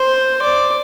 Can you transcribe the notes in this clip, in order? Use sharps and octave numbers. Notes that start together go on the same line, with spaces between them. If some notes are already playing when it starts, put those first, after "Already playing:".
Already playing: C5
D5